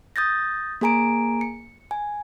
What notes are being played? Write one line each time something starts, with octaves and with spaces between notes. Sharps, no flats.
D#6 G6 A6 A#6
A#3 G#4 G#5 A#5 D7
C#7
G#5